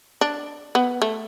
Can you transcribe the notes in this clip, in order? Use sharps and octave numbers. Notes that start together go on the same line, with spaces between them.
D4
B3
A3